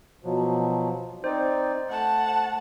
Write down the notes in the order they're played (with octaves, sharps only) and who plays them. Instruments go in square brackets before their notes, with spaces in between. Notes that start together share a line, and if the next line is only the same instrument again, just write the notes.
[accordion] B2 F3 F#3
[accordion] C4 D#4 D5 [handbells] C5
[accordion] A3 [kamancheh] F#5 A5